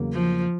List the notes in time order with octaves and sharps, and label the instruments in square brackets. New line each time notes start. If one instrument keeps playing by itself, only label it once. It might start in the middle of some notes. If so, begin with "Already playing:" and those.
Already playing: [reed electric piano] E2 C#3 F#3 A#3
[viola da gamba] F3